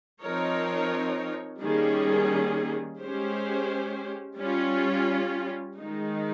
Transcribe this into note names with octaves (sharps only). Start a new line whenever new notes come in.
F3 C4 D#4 A#4 C#5
D#3 G3 A#3 C#4 G#4
G#3 C#4 G4 C5
G3 C#4 F4
D#3 G#3 D#4